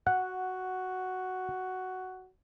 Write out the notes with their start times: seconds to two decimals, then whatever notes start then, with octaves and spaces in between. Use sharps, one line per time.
0.07 F#4 F#5